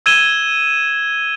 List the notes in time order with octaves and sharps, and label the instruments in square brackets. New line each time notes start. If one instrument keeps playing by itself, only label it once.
[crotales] E6 G#6 D#7 E7 G7